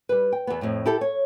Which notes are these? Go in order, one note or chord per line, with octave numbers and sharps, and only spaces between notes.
G3 B4
G5
E2 B3
F2 A2
E4 G4 A4
C#5